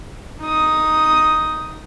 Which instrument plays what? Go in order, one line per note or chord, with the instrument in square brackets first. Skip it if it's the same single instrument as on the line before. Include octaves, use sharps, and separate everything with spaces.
[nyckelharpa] D#4 D#6